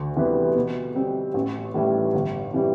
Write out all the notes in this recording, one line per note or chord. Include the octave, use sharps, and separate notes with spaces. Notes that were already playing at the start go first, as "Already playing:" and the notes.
Already playing: D2
C3 E3 G3 B3
B2
G3 C4
A1
A2 E3 G3
G1
C3 E3 G3